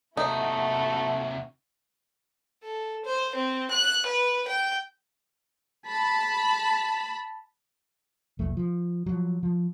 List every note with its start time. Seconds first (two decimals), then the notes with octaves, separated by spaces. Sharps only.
0.17 D#2 C3 A3 D#4 E4 F#4
2.63 A4
3.05 C5
3.35 C4
3.70 F#6
4.06 B4
4.47 G5
5.87 A5 B5
8.39 E1 A#1 A3
8.57 F3
9.06 F3 F#3
9.43 F3